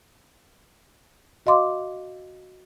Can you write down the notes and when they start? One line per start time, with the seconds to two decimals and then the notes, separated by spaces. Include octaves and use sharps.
1.46 F#4 D#5 F5 C6 D6